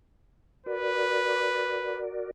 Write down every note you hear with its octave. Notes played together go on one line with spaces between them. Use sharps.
F#4 A#4 B4 D5